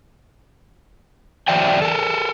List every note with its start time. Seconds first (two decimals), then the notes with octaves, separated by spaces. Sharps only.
1.48 E3 F#3 C5 D5 E5 G5
1.82 A4 A#4